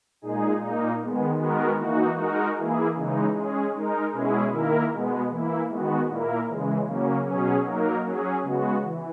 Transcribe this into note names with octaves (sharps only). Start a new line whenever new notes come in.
A#2 G#3 D#4 G#4
A#2 A#3 D#4
D#3 G#3 B3
D#3 G#3 B3 F#4 A#4
E3 A#3 D#4 F#4
G#3 D#4 F#4 A#4
E3 A#3 E4 G#4
C#3 E3 G#3 D#4
G#3 C#4 G#4
G#3 D#4 A#4
B2 G#3 C#4 E4 G#4
D#3 A#3 E4 A#4
B2 G#3 B3
E3 A#3 E4
D#3 G#3 B3 F#4
A#2 A#3 E4 A#4
C#3 E3 G#3
C#3 F#3 A#3 C#4
B2 F#3 C#4 G#4
F#3 A#3 D#4 A#4
F#3 C#4 G#4
C#3 G#3 B3 F#4
E3